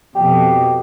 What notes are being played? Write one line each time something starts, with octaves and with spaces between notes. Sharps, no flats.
F2 B2 G4